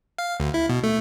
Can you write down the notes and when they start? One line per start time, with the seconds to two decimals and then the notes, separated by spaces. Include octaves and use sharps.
0.18 F5
0.40 D2
0.54 E4
0.69 B2
0.83 A3